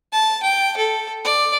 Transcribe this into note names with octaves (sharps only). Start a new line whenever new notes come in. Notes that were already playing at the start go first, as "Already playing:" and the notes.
A5
G5
A4
D5